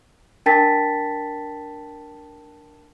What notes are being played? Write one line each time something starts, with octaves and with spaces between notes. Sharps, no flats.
D4 A#4 G5 A5 A6 B6